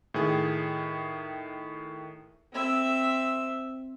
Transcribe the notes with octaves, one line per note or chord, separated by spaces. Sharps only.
A2 D#3 G#4
C4 E5